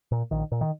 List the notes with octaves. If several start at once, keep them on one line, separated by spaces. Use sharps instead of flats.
A#2
A#1 D#3
A#2
D#3